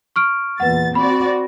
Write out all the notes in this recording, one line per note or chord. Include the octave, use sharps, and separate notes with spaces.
C#6 F6 D7
E2 A#2 B4 F#5 A6
C4 F#4 D5 B5